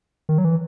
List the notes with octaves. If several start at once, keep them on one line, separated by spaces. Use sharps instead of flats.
D#3
F#3
E3